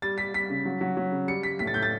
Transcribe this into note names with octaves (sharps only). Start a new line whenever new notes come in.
G3 A6
G3 B6
G3 B6
C#3
F#3
F#3
F#3
C#3
G3 C#7
G3 B6
A2 B6
A6
A2 G6
A6